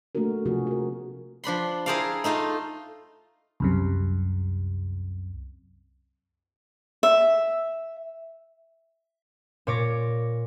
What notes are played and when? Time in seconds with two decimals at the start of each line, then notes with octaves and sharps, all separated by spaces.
0.15 A3 A#3 D4 F#4 A#4
0.45 C3 F3 F#4 G#4
0.67 F#4 A#4
1.44 F3 D4 B5 C6
1.86 E4 G#4 A#4 C5 D5 F5
2.24 A3 D#4 F4 F5
3.60 C2 F#2 C3
7.03 E5
9.67 A#2 C#5 D6 A#6